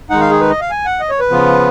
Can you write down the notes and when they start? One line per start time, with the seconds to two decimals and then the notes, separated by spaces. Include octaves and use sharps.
0.10 D#3 G#3 D#4 F#5
0.21 F5
0.30 G#4
0.40 B4
0.50 D#5
0.60 F5
0.71 G#5
0.85 F#5
1.00 D#5
1.10 C#5
1.20 B4
1.30 C#3 F3 B3 F4